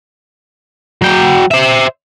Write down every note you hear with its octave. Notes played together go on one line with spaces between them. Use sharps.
F#3 G5
C5 E5